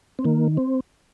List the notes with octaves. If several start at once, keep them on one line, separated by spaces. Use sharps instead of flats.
C4
D#3 A#3
C4